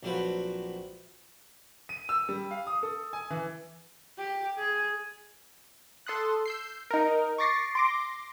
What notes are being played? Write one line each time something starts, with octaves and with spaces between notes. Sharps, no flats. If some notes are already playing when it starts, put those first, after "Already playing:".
A#1 F#3 A3 C4 F#4 B4
D#7
E6
G3
F5
D#6
A4
G#5
E3
G4
G#4
A4 C6 D#6 F#6
E6 G6 C7
D#4 A#4
C#6 D6 A6 A#6 C7 C#7
C6 D6 A#6